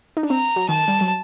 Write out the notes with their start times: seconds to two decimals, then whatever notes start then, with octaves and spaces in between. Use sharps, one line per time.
0.17 D#4
0.23 D4
0.30 C4 A#5
0.56 F#3
0.69 D#3 A5
0.88 G3
1.01 F#3